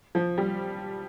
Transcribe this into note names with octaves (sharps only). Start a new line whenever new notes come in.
F3
G3